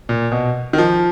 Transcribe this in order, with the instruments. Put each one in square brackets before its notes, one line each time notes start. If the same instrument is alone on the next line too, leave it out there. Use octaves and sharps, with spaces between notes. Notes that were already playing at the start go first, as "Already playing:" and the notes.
[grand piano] A#2
B2
D#3
F3